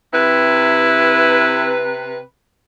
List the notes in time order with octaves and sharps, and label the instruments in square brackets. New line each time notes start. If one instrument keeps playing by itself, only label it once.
[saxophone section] C3 B4 [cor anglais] E4